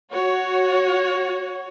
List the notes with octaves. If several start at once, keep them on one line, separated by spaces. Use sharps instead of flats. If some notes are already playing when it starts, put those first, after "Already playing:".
F#4 C#5